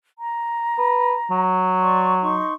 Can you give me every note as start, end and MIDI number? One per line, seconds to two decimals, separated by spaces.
0.19 1.42 82
0.78 1.15 71
1.31 2.44 54
1.81 2.14 74
1.81 2.14 84
1.81 2.14 85
2.22 2.53 63
2.22 2.53 84
2.22 2.53 85